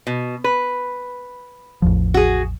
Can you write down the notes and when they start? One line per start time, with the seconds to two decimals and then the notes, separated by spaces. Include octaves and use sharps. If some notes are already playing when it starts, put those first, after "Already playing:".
0.07 B2
0.44 B4
1.82 A1 E2 F3
2.14 F#4 G#4